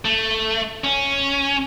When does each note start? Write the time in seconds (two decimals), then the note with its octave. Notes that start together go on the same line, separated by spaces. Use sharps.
0.05 A3
0.84 C#4